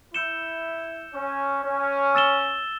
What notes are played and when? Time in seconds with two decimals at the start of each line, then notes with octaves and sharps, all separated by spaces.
0.14 E4 E6 G6 C#7 E7 G7
1.14 C#4
1.65 C#4
2.15 E6 A6 E7 G7